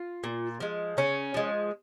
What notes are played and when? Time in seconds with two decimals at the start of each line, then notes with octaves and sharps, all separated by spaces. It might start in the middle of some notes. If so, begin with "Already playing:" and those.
Already playing: F4
0.24 A#2
0.60 F3 G#3
0.97 C#3 C#4
1.34 F3 G#3